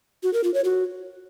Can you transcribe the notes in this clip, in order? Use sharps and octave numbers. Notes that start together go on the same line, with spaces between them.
F#4
A#4
F4
C#5
F#4